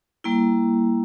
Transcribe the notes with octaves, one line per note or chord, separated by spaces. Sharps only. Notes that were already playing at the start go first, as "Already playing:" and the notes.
G3 A#3 E4